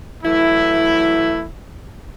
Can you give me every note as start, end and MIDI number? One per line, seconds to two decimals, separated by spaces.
0.23 1.46 52
0.23 1.46 54
0.23 1.46 57
0.23 1.46 64